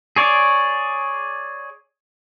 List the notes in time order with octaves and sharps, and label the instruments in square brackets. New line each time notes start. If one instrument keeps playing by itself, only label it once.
[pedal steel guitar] G#4 C#5 D5